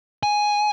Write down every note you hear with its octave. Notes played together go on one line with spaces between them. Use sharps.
G#5